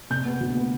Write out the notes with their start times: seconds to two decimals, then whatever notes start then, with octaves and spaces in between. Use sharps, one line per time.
0.10 C3 G6
0.25 B3
0.40 D2
0.55 B3